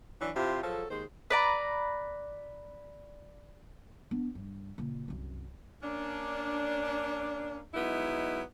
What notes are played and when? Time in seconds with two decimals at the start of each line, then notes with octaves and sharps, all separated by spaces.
0.21 E3 F#3 D4
0.35 C3 C4 E4 F4
0.62 F3 F#3 G#4 A4
0.90 D#2 D#3 G#3 C5
1.30 B4 D5 A#5
4.11 B3 D4
4.35 G2
4.78 A#2 C#3
5.08 C2 F#2
5.83 A#3 C#4 D4
7.74 F#3 G#3 B3 D#4 E4